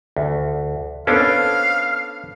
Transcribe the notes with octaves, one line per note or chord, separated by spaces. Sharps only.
D2
B3 C#4 D4 A4 C5 F5